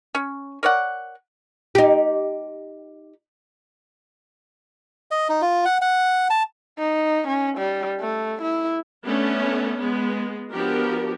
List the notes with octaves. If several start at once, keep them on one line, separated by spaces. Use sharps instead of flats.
C#4 C#5
A#4 C#5 D5 F#5
D#4 G4
D#5
D#4
F4
F#5
F#5
A5
D#4
C#4
G3
A3
E4
A3 B3 C#4 D4
G#3 B3
F3 B3 D4 F#4 G4 A#4